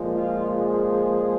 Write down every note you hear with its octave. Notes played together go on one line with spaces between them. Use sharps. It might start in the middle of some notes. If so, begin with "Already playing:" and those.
Already playing: A#2 F3 G#3
F4
G#4